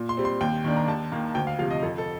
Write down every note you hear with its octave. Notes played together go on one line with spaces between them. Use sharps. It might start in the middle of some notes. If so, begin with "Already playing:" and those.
Already playing: A#2
C6
G3 C4
C6
D#2 G5
D#3 A#3 D4
A#5
D#2 A5
D#3 A#3
D2 G5
F5
C3 F3 F5
D#5
F2 A4
A4